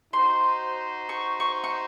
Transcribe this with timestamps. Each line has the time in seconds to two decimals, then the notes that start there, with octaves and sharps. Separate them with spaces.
0.13 D#4 F#4 C5 C6
1.09 C#6
1.40 C#6
1.64 C#6